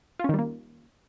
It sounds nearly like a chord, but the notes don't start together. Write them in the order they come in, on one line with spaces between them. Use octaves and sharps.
F4 C#4 D#3 G3 A#3